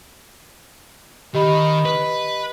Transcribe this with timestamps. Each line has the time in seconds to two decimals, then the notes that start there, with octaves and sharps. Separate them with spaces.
1.34 D#3 G4 D#5 B5
1.85 B4